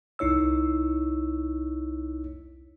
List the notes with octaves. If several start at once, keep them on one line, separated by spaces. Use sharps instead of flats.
C2 D#4 E4 C#5 E6